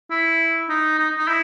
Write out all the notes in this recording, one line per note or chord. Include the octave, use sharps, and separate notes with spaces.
E4
D#4
D#4
D#4
E4